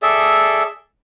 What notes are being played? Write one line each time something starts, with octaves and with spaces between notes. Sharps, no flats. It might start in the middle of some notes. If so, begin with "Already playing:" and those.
G#4 A4 D5 E5